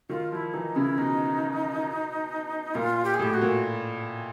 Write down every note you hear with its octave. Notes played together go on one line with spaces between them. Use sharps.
D#3 F4
F3 E4 F4
E3 D#4
C#3 E4
B2 D#4
A#2 F4
G4
G#4
A2 G4
F#4
A#2